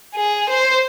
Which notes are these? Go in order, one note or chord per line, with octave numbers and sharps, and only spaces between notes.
G#4
C5